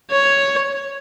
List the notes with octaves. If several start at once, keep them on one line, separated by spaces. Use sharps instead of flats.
C#5